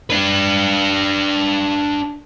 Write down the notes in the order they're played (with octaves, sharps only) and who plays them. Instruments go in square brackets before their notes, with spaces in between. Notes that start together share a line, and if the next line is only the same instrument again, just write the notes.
[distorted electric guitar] D4 B4